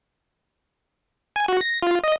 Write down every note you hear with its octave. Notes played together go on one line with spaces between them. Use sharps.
G#5
F#4
A#6
F4
D#5